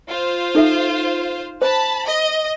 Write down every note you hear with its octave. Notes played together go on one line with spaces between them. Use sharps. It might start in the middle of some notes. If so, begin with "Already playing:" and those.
F4 C5
D#4 A4 E5
C5 A5 B5
D#5